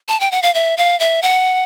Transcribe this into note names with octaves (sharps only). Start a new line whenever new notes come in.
A5
G5
F#5
F5
E5
F5
E5
F#5